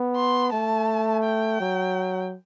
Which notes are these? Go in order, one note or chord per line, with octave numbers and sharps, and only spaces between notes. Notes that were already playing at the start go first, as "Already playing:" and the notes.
Already playing: B3
C6
A3 A5
G5
F#3